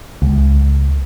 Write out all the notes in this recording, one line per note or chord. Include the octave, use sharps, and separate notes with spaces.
C#2